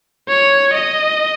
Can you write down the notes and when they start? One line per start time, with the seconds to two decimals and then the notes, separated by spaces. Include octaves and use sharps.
0.29 C#5
0.74 D#5